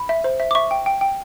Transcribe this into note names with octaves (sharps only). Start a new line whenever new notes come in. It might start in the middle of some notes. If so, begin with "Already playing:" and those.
Already playing: B5
E5
C5
E5
D6
E5 C#6
G5
G5
G5